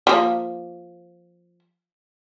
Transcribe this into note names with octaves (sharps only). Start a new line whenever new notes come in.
F3 A#3